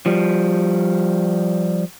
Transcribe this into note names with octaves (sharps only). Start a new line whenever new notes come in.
F3 G3